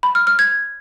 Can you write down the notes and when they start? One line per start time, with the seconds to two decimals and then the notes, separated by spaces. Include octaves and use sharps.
0.03 B5
0.15 F6
0.27 F6
0.39 G#6